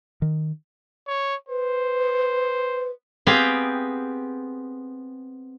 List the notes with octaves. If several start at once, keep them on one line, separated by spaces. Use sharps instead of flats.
D#3
C#5
B4 C5
B3 C4 G4 G#4 F5 G5